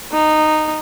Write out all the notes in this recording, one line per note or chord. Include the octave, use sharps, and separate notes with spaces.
D#4